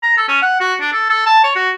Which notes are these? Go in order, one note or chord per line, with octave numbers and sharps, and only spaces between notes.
A#5
A4
C#4
F#5
F#4
D4
A4
A4
A5
C#5
F#4